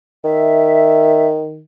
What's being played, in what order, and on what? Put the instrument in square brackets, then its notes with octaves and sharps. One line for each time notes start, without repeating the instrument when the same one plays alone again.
[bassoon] D#3 [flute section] E5